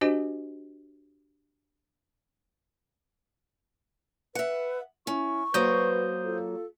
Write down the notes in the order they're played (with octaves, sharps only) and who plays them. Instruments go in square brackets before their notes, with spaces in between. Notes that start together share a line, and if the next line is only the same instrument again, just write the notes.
[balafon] D4 F#4 G4 C5 D#5 G#5
[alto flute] B4 [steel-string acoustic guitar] E5 F#5
[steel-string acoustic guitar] C#4 [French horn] E4 [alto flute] C#6
[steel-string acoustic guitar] F#3 A#3 F#4 [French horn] B4 [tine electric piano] C5 D#6 G6
[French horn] F4 [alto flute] A4